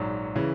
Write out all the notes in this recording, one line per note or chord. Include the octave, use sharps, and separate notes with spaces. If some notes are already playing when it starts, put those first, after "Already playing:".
Already playing: A#1 G#2 F#3
C#3 E3